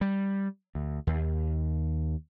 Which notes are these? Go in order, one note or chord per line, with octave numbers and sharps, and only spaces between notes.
G3
D2
D#2